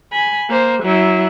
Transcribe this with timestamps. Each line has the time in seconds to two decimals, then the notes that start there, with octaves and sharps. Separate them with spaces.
0.12 G#5 B5
0.50 A#3 C5
0.83 F#3 E4